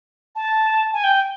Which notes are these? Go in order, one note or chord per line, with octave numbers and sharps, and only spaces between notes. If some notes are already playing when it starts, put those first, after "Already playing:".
A5
G#5
G5